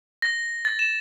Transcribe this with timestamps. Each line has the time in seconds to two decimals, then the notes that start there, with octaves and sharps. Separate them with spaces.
0.22 A#6
0.65 A6
0.79 E7